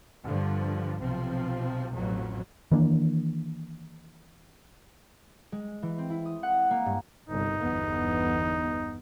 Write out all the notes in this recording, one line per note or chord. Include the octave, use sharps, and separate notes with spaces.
G2 D3 F3
B1 C3 F3 C4
A1 F2 B2 F#3
D#3 E3 A#3 D4
G#3
E3
C4
E4
D#6
F#5
A#3
G2
G1 C2 D#4
G1 E2 B3